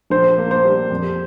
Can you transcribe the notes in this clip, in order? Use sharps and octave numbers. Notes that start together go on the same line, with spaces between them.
A#1 C5
A#3
C5
G3
F2